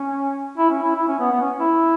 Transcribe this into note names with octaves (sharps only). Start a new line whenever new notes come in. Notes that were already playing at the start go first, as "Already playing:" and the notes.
Already playing: C#4
E4
C#4
E4
E4
C#4
B3
B3
C#4
E4